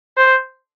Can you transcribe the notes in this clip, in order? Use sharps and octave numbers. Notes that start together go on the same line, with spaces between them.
C5